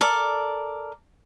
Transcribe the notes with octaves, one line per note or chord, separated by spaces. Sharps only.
A4 A#4 D5